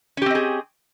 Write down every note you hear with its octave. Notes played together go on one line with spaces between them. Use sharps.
C4 C#4 G4 G#4 D#5